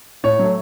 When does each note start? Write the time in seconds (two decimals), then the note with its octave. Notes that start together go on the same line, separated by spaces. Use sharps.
0.24 A2 C#5
0.39 F#3 A3